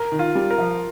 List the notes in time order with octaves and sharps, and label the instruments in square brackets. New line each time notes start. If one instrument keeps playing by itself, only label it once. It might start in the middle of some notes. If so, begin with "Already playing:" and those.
Already playing: [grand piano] A#4
[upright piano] D#3
[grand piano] F4
[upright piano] G3
[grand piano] A#4
[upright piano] F3